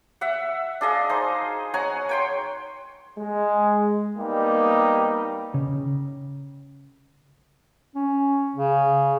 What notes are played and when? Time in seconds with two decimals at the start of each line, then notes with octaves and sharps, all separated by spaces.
0.21 E5 F#5
0.81 D4 G#4 D#5 F5
1.09 D#4 C5
1.74 C#5 F#5 G#5 A#5
2.09 C#5 G5 C6
3.18 G#3
4.18 G3 A#3 B3 D#4 G4
5.54 C#3
7.95 C#4
8.56 C#3